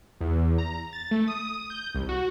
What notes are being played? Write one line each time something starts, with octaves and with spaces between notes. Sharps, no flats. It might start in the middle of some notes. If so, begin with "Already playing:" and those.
E2
A#5
A6
A3
D#6
G6
C2
F#4